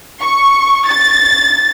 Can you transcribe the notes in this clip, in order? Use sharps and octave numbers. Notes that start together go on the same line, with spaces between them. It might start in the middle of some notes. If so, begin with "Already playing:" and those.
C#6
A6